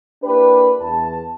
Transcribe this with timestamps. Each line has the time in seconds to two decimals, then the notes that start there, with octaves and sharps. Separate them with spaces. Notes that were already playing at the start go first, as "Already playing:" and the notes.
0.23 A#3 D4 E4 G4 B4
0.81 E2 A5